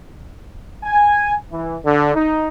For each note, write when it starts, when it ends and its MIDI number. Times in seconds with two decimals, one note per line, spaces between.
0.84 1.33 80
1.50 1.76 52
1.84 2.13 50
2.15 2.48 63